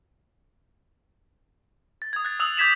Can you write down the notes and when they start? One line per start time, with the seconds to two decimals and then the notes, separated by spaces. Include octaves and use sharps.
2.02 A6
2.13 D#6 G#6
2.25 F#6 A6
2.40 D#6 E6 F#6 F7
2.57 D6 G6 G#6 B6 E7 F7